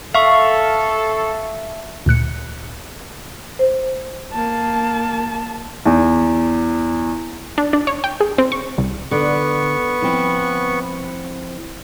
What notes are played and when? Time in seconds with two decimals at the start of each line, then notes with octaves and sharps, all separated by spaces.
0.14 A4 E5 F5 C#6
2.06 D2 A#2 F#6 C#7
3.59 C5
4.33 A#3 A5
5.86 E2
7.58 D4
7.73 D4
7.87 C#5
8.04 G5
8.20 G#4
8.38 C4
8.52 C#6
8.78 C2
9.11 D3 B3 C#6
10.02 F3 C4 E4